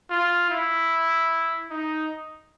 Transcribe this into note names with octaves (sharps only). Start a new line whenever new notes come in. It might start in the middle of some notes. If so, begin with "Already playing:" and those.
F4
E4
D#4